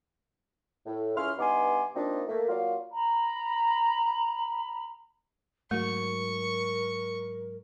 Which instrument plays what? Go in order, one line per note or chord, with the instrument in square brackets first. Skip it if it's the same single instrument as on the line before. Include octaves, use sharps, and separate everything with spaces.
[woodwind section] A2
C#2 C#4 E4 C6 F6
G2 B3 D#4 G#5 C6 D6
F3 A#3 C4 D4 D#4 F4
A3 A#3
F#3 A#3 F4 D5 F5
[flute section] A#5 B5
[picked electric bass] G#2 F#3 [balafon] A3 [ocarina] A#4 [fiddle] C#6